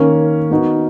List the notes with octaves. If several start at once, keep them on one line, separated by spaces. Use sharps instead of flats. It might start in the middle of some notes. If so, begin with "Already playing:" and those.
Already playing: D#3 A#3 C#4
B3 D#4 F#4